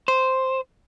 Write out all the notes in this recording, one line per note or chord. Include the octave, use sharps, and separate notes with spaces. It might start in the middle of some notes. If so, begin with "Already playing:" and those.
C5